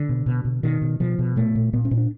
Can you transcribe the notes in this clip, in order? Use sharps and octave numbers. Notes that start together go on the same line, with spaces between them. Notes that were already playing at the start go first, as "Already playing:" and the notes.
Already playing: D3
B2
B2
B2
B2 D#3
B2
B2 F3
B2
A#2 A3
A#2
A#2 B3
C#4
A#2
D4